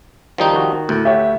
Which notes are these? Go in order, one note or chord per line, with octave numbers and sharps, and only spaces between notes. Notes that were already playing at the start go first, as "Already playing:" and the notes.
D#3 F3 G3 D#4
D#3 F#4
D2 A2
G4 C#5 E5 F#5